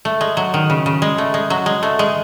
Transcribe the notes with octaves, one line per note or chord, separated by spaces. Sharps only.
A3
G#3
F#3
D#3
C#3
C#3
G#3
A3
G#3
F#3
G#3
A3
G#3